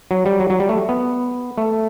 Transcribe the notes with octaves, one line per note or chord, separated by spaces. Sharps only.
F#3
G3
F#3
F#3
G3
A3
B3
A3